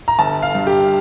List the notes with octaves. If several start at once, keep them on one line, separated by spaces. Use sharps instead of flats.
A#5
G1 A5
F5
G2
G4